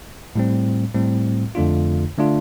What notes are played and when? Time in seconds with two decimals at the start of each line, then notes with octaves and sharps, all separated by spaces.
0.36 A2 G3 C4
0.95 A2 G3 C4
1.55 F2 D3 A3 D4 F4
2.18 D3 A3 D4 F4